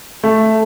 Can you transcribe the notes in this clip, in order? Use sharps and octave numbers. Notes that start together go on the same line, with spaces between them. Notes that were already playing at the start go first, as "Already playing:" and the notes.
A3